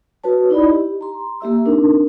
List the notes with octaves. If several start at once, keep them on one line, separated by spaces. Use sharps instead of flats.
F#4 B4 C#5 A5
D#4 E4 D5 D#5 B5
G4
A#5 C6
A#3 G4 E5 E6
C4 D4 D#4 A#4